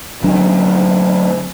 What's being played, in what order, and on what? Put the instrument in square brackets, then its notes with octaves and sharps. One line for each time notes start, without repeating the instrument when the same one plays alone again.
[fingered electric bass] D3 F#3 C#4 D4